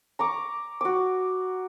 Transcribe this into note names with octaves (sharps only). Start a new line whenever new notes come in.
A#5 C#6 D6
F#4 D6